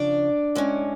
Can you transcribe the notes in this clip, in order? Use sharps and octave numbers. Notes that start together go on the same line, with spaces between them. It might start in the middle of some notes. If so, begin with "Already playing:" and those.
Already playing: C#3 F3 D4 D5
A2 G#3 C#4